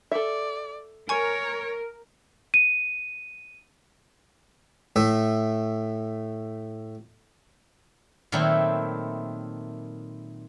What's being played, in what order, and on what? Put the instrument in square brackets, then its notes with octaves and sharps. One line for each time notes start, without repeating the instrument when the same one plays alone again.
[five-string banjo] A4 E5 [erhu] D5
[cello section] A#4 [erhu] C#5 [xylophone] G#5 C#6
[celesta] D#7
[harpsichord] A2 A3 E5
[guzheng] A#2 D#3 F#3 A3 C4 E4